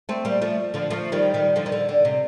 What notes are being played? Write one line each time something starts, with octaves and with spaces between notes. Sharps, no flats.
A3 C4
G3 A#3
F3 A3
D3 F3
F3 A3
D#3 G3
D#3 G3
D3 F3
D#3
D3
D3
C3